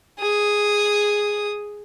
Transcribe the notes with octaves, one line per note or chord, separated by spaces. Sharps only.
G#4 D#6